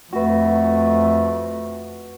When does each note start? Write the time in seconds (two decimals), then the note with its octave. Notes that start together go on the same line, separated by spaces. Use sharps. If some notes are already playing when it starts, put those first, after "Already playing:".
0.13 F2 A3 F#4 B4